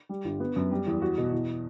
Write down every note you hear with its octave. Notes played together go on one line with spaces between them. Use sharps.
G3
G1
B3
F#2
G3
E2
F#4
B2
E2